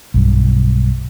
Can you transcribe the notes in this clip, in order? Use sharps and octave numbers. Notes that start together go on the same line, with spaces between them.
B1 G2